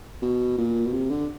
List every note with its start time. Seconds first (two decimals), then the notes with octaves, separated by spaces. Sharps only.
0.22 B2
0.58 A#2
0.86 B2
0.93 C3
1.10 D3